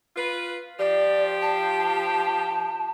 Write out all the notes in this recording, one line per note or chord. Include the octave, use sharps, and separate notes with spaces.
F4 B4
F3 G4 D5
A5